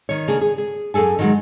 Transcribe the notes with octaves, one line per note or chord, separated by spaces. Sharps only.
D#3 C#5
C#3 A#3 D4 G#4
G#4
G#4
F#2 C#3 G#4 A4 G#5
D#3 F#3 G#3